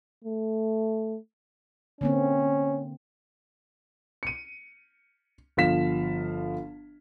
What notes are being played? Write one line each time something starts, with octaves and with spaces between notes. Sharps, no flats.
A3
D3 A#3 C4 C#4
C#7 D#7
G1 F3 F5 B6 E7